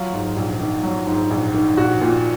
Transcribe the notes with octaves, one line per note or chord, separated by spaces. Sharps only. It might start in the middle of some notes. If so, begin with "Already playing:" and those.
Already playing: F#3 F4
G#2
A#1
D#3
F#3
G#2
A#1
D#3
A#1 F#4
A#2